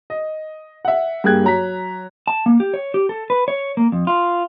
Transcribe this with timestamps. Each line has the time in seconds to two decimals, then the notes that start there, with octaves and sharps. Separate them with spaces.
0.10 D#5
0.85 E5 F#5
1.24 G2 A#3 G#4 G5 F#6 G#6
1.44 F#3 A#5 B6
2.28 A5
2.46 A#3
2.60 G4
2.74 C#5
2.94 G4
3.09 A4
3.30 B4
3.48 C#5
3.77 A#3
3.92 F2
4.07 F4